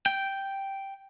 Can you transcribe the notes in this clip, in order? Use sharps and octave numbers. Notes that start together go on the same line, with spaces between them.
G5